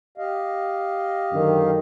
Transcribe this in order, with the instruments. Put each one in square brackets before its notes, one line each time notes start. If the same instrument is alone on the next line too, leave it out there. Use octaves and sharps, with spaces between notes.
[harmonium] G4 D#5 F5
[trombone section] F#2 D3 D#3